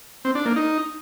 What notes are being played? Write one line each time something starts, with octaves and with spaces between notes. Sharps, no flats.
C4
D4
A#3
D#4